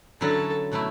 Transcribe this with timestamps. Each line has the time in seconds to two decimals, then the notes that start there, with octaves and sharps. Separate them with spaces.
0.21 D3 F#3 C#4 E4 A4
0.72 B2 F#3 A3 E4